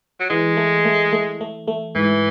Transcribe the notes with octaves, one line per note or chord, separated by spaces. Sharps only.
F#3
E3 G#3
A3
A3
A3
A3
A3
G#2 E3